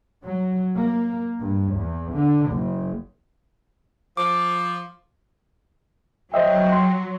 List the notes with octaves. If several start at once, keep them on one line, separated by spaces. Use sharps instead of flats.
F#3
A#3
G2
E2
D3
F#1
F3 D6
F#3 C5 D#5 E5 G5
C6